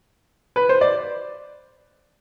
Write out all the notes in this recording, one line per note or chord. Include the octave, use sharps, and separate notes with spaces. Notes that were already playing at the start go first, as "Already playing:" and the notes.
B4
C5
D5